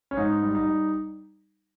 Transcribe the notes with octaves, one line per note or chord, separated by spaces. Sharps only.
C#4
G#2 D#4
G3
D#4
G3